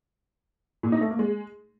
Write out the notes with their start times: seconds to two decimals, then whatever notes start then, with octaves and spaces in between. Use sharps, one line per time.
0.83 A#2
0.92 D#4
1.01 A3
1.10 A#3
1.19 G#3